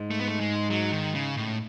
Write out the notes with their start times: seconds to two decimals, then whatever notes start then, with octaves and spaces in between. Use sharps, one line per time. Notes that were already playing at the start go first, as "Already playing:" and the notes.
Already playing: G#2
0.11 A3
0.20 B3
0.28 A3
0.40 G#3
0.70 F#3
0.93 D#3
1.15 C#3
1.37 A2